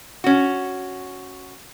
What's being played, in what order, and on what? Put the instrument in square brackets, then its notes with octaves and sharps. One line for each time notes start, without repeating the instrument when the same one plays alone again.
[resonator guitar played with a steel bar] C#4 F#4